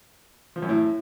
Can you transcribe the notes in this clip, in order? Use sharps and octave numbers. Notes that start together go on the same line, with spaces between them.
F3
F#2
A2